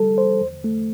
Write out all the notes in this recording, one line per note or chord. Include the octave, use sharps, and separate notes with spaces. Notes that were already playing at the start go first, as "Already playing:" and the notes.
Already playing: G3 A4
C5
E2
A3